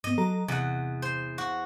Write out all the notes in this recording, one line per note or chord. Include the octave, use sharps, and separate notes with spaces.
G#2 B3 D#5
F#3 A4 A#5
E2 C3 F#5
C5
F#4